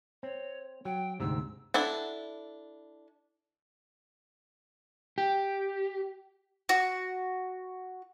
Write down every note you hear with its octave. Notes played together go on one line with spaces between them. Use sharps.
C4 C#5
F#3 G5
D2 G#2 C3 E6
D4 E4 A4 F#5
G4
F#4